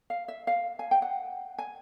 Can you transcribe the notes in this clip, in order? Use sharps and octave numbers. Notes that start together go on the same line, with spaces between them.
F5
E5
F5
G#5
G5
F#5
G#5